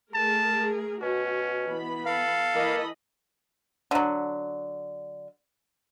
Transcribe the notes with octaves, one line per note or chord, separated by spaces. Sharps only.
A3 G#4 A#4 A5
B2 C#4 F#4
E3 B3 B5
A4 F5
E3 A#3 D#5 B5
D3 F#3